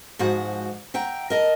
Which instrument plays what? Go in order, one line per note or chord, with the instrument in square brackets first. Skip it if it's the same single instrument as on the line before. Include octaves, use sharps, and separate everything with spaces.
[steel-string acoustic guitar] G#2 F3 F#4 F#5
E5 F#5 G5 A#5
A#4 D#5 A5